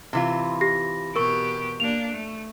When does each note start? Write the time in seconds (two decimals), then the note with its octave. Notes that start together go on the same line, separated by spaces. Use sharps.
0.13 C3 E3 F4
0.61 G4 A#6
1.16 B2 G4 A#4 C#6
1.80 A#3 D4 F7
2.11 A3